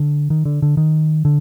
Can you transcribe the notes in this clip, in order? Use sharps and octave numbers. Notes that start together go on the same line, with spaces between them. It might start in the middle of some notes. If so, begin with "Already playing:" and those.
Already playing: D3
D#3
D3
D3
D#3
D3